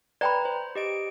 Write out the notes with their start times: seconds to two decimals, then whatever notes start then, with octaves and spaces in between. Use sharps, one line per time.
0.21 B4 D5 G5 A#5 B5
0.45 C5
0.75 G4 D#5 D7